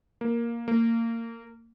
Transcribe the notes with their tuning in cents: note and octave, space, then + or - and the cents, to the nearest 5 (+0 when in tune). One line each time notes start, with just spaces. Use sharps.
A#3 +5
A#3 -25